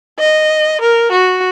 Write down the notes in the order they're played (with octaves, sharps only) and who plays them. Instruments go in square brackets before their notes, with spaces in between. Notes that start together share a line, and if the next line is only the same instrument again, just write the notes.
[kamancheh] D#5
A#4
F#4